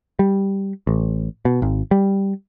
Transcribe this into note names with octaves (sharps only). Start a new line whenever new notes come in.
G3
A1
B2
G#1
G3